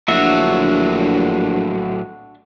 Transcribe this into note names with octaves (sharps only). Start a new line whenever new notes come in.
A#1 A2 F#3 D4 F#4 E5